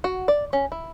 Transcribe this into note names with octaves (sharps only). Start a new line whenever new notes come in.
F#4
D5
C#4
E4